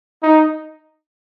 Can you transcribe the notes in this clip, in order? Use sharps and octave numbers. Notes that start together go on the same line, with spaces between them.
D#4